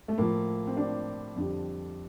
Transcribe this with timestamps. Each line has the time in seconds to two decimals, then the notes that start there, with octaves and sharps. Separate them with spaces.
0.08 A3
0.18 A2 F3 A#3
0.67 C4
0.77 D4
1.36 F2 D3 G3